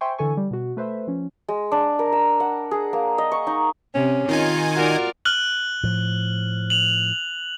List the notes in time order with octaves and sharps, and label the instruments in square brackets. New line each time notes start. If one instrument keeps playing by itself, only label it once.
[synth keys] C5 E5 G5 G#5 C6 C#6
D3 E3 A4 G#5 C#6
G3
B2 F#4
A3 B4 C5 E5
F3 C#4
[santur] G#3
D4
A#4
E6
F#5
G#4
A#3
D#5
C#6
D#4
[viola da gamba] C3 [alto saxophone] C#4
[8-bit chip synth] D#3 D#4 G#5 [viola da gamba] F4
[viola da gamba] F4 A#4 D5 [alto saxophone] F#4
[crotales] F6 F#6 F#7
[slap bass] A2 F3
[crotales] F7 F#7